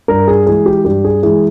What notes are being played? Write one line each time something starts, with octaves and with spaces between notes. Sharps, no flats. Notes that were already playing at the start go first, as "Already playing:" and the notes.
G2 A#4
G#4
E3 G#3 G#4
G4
G2 G4
G#4
E3 G#3 G#4